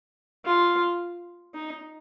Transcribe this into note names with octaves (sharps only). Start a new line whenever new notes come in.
F4
D#4